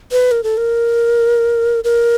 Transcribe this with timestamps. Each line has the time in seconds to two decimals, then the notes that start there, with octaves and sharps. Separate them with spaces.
0.12 B4
0.31 A#4
0.44 A4
0.57 A#4
1.84 A#4